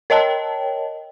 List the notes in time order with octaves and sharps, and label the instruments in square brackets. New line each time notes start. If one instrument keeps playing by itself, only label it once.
[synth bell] A#4 C#5 D#5 G5 A5